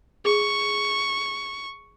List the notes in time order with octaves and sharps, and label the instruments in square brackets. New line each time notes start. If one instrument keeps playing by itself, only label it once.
[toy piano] G#4 [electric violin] C#6